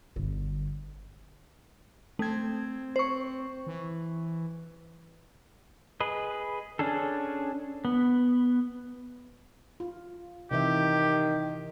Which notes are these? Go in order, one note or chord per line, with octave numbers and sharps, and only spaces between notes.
G1 D3
A3 C4 G#6
C5 C#6
E3
G#4 B4 D#5
C#4 D4 G#4 A4
B3
F4
C3 D#3 E3 G4 E5